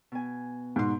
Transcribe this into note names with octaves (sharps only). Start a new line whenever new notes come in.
B2 G#5
G#2 B2 D#4 C6